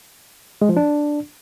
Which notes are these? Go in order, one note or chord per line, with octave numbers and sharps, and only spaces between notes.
G#3
F3
D4